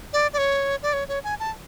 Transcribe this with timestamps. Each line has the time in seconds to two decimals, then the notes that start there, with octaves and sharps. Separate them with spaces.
0.13 D5
0.33 D5
0.38 C#5
0.83 D5
0.93 C#5
1.08 C#5
1.24 G#5
1.40 A5